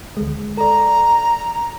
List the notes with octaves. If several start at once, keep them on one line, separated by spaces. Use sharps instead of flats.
D2 G#3
A4 D5 A#5